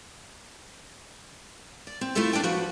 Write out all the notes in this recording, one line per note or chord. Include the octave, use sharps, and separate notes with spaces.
D5
C4
A3 E4 F4 A4 E5
E2 D4 D5 G5 G#5
F3 F#4 B4